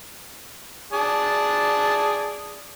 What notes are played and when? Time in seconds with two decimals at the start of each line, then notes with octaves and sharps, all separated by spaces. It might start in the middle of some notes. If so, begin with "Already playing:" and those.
0.93 G#4 D5 A5